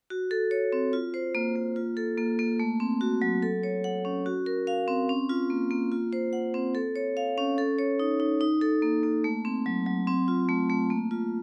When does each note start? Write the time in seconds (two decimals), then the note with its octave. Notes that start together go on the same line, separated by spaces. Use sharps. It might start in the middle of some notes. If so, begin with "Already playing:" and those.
0.10 F#4
0.31 A4
0.51 C#5
0.72 C4
0.93 F4
1.14 C5
1.35 A#3
1.56 A#3
1.76 F4
1.97 A4
2.18 A#3
2.39 A#3
2.60 A3
2.80 C4
3.01 F#4
3.22 F#3
3.43 A4
3.63 C#5
3.84 F#5
4.05 C#4
4.26 F#4
4.46 A#4
4.67 F5
4.88 C4
5.09 C#4
5.29 F4
5.50 A#3
5.71 A#3
5.92 F4
6.13 C5
6.33 F#5
6.54 C4
6.75 A4
6.96 C#5
7.17 F5
7.38 C#4
7.58 A4
7.79 C#5
7.99 D#4
8.20 D#4
8.41 D#4
8.61 A4
8.82 A#3
9.03 A#3
9.24 A3
9.45 C4
9.66 F#3
9.86 F#3
10.07 C4
10.28 F4
10.49 A3
10.70 A3
10.90 A#3
11.11 F4